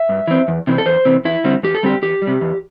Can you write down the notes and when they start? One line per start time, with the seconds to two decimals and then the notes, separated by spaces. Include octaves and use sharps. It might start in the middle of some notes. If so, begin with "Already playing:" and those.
Already playing: E5
0.09 G2
0.27 E3 C4
0.48 E2
0.67 C3 E3 C4
0.78 A4
0.85 E2 C5
1.05 C3 E3 C4
1.25 E2 E4
1.44 D3 G3 C4
1.63 E2 G4
1.75 A4
1.83 D3 G3 C4 G4
2.02 E2 G4
2.22 G3
2.27 C3
2.41 E2